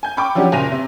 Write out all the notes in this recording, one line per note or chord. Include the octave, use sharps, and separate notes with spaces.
G#5 G6
G5 B5 C#6 D6
F3 F#3 C#4 D4 F#4 G4
F#1 A#2 A#6 D#7 F7
C3